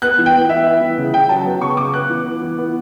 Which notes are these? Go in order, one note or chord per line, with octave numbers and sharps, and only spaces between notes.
B3 F#6
E3
G5
B3
E3 E5
B3
E3
C#3
C#3 G5
F#3 A5
B3
C#3 C#6
C#3 D6
B3 F#6
E3
B3
E3
B3